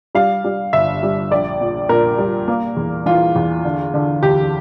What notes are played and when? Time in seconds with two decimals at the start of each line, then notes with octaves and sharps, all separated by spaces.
0.15 G3 F5
0.44 G3
0.73 G1 E5
1.03 G3
1.31 A#1 D5
1.61 A#2
1.89 A#2 A#4
2.18 G3
2.48 A#3
2.77 E2
3.06 E3 F4
3.36 E2
3.64 D3
3.94 D3
4.23 D2 G4